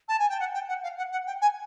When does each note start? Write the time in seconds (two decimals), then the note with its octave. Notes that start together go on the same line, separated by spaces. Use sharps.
0.08 A5
0.19 G#5
0.29 G5
0.40 F#5
0.54 G5
0.69 F#5
0.83 F5
0.98 F#5
1.12 F#5
1.27 G5
1.41 G#5